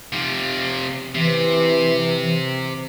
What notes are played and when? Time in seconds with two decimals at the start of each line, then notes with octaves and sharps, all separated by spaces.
0.12 C3 F3
1.15 C3 E3